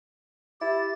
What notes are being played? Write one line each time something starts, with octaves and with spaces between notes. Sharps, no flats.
E4 G4 A6